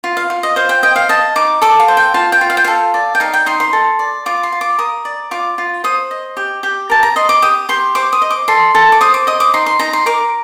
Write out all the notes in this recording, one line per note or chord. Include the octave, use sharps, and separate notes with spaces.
F4
F5
F4
D#5
C5 F5
G5
D#5 G5
F5
D#5 A5
D#4 D6
A4 D6
F5
C5
G5
F4 A5
G5
F4
F5
G5
A4 F5
D5
G5
D#4 F5
G5
D#4 C6
C6
A4
D5
F4 D6
C6
F4
D6
A#4 D#6
D5
F4 D6
F4
C5 D#6
D#5
G4
G4
A#4 A5
A#5
D#5 C6
D6
G4 D#6
G4 C6
C5 D6
D#6
D#5
D6
A4 C6
A4
D6
C5 D#6
D6
D#5 D#6
D6
D#4 C6
C6
D#4 A#5
C6
A#4 D6